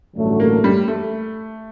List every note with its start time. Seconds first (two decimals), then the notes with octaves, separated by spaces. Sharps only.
0.15 A1 G2 D3 F#3 A3
0.40 A#3
0.64 G3
0.88 A3